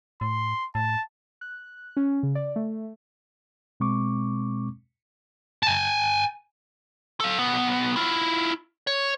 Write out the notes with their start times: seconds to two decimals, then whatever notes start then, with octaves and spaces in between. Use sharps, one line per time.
0.21 A2 C6
0.75 A2 A5
1.41 F#6
1.97 C#4
2.23 C#3
2.35 D5
2.56 A3
3.80 B2 G#3 C4 C#6 D6
5.63 G#5 A5
7.20 A4 F5
7.39 B1 B3
7.96 E4 F4
8.87 C#5